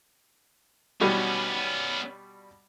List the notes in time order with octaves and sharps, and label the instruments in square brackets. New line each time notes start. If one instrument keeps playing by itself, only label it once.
[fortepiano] B2 G3 [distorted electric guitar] B3 C#4